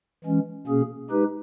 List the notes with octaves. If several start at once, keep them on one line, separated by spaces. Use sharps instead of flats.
E3 G#3 C#4
B2 A#3 C#4 G#4
G#3 D#4 G4 B4